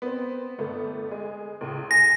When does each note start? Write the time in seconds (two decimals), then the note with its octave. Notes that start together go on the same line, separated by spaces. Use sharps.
0.02 B3 C4
0.58 G1 A3 B3
1.11 G#3
1.61 C#2 A2
1.91 G#5 A#6